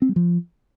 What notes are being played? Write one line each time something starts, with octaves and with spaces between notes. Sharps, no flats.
C4
G3
F3